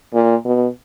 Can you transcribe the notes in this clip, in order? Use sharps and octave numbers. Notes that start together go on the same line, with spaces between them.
A#2
B2